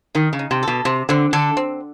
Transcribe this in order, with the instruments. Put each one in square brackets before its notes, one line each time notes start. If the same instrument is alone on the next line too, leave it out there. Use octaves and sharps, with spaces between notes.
[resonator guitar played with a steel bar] D#3 [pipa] D#4
[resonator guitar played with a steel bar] C#3
[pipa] D#4
[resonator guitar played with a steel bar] C3
[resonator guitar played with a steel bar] B2 [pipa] A4
[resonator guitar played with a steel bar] C3 [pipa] C4
[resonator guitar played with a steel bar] D3 [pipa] C4
[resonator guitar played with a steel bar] D3 [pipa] A4
[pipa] C4